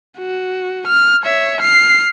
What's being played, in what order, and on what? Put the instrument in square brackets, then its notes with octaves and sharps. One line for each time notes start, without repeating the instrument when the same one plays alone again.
[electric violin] F#4
F6
C#5 E5
F6 C7